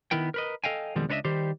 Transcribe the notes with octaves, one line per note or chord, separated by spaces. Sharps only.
D#3 B3 E4 A#4 G5
A#4 B4 D#5
A4 D#5 F5 G5 G#5
F2 B2 D#3 G3 G#3
C#2 D4 A4 B4 D#5 E5
D#3 G3 G4 C5